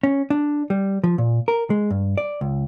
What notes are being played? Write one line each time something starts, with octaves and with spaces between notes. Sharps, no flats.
C#4
D4
G3
F3
A#2
A#4
G#3
G2
D5
C#2